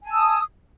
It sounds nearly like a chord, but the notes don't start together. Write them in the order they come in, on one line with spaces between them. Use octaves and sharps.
G#5 A5 E6 D#6